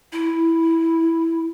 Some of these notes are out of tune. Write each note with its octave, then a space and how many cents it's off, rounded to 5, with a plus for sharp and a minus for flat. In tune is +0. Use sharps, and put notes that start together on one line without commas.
E4 -5